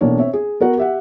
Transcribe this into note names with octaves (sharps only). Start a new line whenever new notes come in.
B1 E3 A#3 D4 C#5
C4 C#5 E5
G#4
B3 F#4 A#4 F#5
G4 E5 F#5